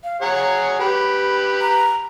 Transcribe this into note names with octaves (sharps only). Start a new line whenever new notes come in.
F5
G#4 C#5 F#5 A#5
G4 B4 B5
A#5